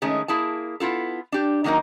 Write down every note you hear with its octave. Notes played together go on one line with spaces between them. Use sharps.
D#3 G#3 A3 C#4
A#3 E4 G#4 A5
B3 E4 F4 A4
D4 G4
D#3 F#3 A#3 D#4 A#4